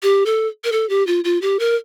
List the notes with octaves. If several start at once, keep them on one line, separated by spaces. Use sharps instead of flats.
G4
A4
A#4
A4
G4
F4
F4
G4
A#4